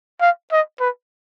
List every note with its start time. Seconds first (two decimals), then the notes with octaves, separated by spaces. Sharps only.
0.21 F5
0.52 D#5
0.80 B4